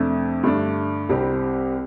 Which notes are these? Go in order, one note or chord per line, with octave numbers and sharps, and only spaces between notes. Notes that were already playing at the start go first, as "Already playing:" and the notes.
Already playing: F2 C3 A3 D4
G2 D3 A3 D4
C2 C3 G3 C4 G4